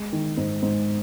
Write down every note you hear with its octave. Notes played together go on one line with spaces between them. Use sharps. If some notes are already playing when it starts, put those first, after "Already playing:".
Already playing: G#3
D#3
G#2
G#2